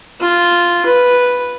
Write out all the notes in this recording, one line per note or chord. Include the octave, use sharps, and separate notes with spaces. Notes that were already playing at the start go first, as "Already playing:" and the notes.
F4
B4